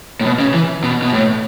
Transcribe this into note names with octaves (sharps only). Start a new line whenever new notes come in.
A2
B2
C#3
E3
B2
B2
A2